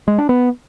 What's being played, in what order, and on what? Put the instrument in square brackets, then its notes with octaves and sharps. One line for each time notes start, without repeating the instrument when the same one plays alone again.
[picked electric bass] G#3
D4
B3